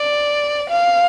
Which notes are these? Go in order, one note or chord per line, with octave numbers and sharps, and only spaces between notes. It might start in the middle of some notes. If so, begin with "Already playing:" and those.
Already playing: D5
F5